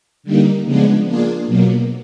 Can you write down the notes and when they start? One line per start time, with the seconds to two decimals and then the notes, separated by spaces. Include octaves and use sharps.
0.23 D3 G3 A#3 D#4
0.64 C#3 F3 G#3 B3 D4
1.06 A#3 D4 F4 G#4
1.47 B2 F#3 A#3